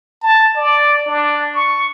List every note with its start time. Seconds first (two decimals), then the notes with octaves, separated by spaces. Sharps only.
0.22 A5
0.56 D5
1.06 D4
1.54 C#6